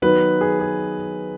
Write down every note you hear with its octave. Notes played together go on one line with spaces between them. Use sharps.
D#3 F#3 B3 D#4 B4
G#4
G#4